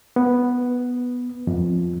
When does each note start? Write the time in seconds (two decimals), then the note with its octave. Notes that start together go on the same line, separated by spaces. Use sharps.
0.16 B3
1.47 F2